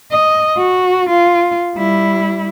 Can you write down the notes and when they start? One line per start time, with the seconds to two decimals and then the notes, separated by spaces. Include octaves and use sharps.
0.11 D#5
0.57 F#4
1.10 F4
1.75 G3 E4